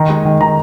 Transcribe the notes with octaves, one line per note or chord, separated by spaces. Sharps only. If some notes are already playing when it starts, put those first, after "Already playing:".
Already playing: D#3 A#5
G#3
D#3
D#3 A#5